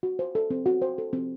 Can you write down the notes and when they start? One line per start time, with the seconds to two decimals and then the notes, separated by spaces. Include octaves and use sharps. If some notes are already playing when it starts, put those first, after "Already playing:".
0.03 F#4
0.19 C5
0.35 A4
0.50 C4
0.66 F#4
0.82 C5
0.98 A4
1.13 C4